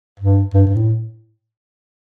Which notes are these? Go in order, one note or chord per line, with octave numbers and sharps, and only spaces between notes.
G2
G2
G2
A2